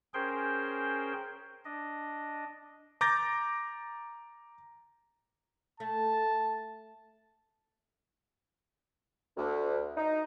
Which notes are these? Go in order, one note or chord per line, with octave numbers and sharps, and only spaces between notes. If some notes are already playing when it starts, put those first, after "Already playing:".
C#4 G#4 A#4 C5 G5 C6
D4 D#5
A#5 D6 G6 A6 A#6
A3 A5
D2
D#4